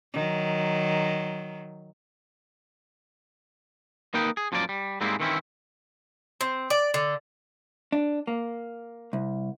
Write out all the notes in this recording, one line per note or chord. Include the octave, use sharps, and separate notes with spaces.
D#3 F#3
A#3 D#4 A#4 B4 D#5 G5
G#4
F#2 F3 A#3 F#4 D5
G3
G#2 G3 G#3 A#3 C4 E4
D#3 E3 C4 C#4 E4
C4
D5
D3
D4
A#3
C2